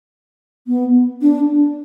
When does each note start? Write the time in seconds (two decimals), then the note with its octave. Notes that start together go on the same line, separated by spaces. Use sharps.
0.67 B3
1.22 D4